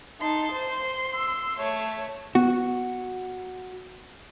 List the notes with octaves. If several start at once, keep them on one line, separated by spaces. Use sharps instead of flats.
D#4 A5 C6
C5
E6
A3 C#5
B3 F#4